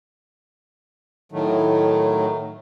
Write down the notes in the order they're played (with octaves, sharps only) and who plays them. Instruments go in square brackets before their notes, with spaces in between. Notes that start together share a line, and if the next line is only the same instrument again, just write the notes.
[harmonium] A2 D#3 F#3 A3